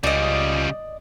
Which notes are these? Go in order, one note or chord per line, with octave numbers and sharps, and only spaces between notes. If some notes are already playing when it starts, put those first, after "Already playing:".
C#2 C#3 G3 D5 D#5